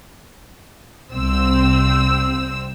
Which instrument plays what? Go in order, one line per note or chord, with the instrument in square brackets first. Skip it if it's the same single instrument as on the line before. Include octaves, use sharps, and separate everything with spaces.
[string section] C2 C4 E6